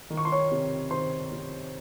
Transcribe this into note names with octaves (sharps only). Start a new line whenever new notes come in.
D#3
C#6
C6
C#5 C#6
C3
D#3 C5 C6
C3